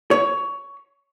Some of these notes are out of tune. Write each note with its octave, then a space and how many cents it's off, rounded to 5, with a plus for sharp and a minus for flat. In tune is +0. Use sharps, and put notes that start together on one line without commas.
C#5 +15